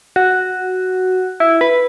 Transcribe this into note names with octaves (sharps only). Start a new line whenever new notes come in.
F#4
E4
B4